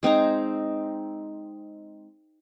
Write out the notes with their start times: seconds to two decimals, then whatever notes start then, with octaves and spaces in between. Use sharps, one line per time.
0.03 G#3 C4 D#4 A#5